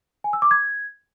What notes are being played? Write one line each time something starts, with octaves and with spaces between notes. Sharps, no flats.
G#5
E6
D6
G#6